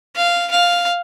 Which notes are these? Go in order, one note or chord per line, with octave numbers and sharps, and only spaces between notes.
F5
F5